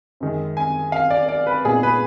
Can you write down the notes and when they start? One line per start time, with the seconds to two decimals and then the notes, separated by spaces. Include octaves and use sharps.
0.20 F#2 D#3 G#3
0.57 G#5
0.92 F5
1.10 D5
1.29 D5
1.47 B4
1.64 A#2 G#3 B3 D#4 G#4
1.83 B4